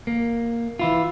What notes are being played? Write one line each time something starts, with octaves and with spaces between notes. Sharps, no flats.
A#3
E3 E4 F4